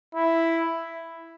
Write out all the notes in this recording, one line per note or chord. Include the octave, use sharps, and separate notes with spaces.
E4